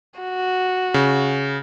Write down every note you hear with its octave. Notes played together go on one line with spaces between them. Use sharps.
F#4
C#3